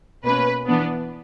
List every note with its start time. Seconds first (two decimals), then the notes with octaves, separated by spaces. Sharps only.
0.24 B2 A#3 C#4 B4
0.67 E3 B3 D4